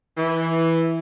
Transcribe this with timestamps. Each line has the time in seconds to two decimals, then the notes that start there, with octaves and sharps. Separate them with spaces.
0.18 E3